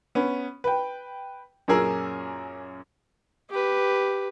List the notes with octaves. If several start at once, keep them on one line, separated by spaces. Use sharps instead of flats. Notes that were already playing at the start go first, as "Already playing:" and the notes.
B3 C#4
B4 G5
F#2 A#2 C#4 G#4 A#4 E6
G4 B4